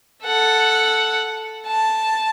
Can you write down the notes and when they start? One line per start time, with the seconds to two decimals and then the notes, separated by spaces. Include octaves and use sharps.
0.25 A4 F#5
1.67 A5